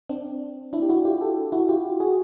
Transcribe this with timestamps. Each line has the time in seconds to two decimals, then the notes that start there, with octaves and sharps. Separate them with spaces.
0.09 C4 D4
0.73 D4 E4
0.82 G4
0.89 E4 F#4
1.05 F4 G4
1.21 G4 A4
1.52 E4 F#4
1.69 F4 G4
2.00 F#4 G#4